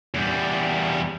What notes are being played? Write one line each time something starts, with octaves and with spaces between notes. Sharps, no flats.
E2 G3